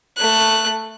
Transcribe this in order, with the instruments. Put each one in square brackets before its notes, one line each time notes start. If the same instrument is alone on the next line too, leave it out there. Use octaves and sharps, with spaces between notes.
[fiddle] A3 F#6